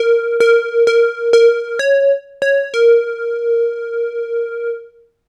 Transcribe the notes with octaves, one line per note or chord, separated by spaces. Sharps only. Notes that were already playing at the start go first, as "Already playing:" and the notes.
Already playing: A#4
A#4
A#4
A#4
C#5
C#5
A#4